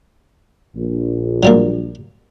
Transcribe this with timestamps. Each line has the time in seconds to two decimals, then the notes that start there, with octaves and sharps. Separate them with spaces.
0.76 A#1
1.43 F#3 G3 A#3